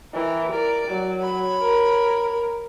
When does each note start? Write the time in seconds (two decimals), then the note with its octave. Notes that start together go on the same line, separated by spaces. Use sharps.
0.14 E3 A#4 G5
0.52 A#4 D5
0.88 F#3
1.20 C#5 B5
1.62 A#4